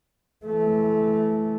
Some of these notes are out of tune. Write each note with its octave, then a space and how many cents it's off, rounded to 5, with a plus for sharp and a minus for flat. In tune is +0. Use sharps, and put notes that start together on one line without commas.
E3 +5 A3 -20